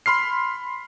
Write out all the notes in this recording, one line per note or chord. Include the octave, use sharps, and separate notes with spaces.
B5 C6 F6 C7